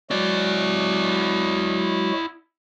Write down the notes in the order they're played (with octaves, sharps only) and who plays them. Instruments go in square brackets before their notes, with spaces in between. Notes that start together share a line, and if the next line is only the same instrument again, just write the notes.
[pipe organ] F#3 G#3 F#4 [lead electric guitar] E4 D5